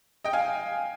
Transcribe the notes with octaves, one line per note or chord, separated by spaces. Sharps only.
D#5 G5
F5 G#5